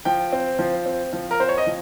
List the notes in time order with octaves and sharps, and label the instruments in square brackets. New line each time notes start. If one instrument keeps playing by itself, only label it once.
[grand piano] F3 G5
C4
F3
C4
F3
A#4
C4 C5
C#5
D#5
F3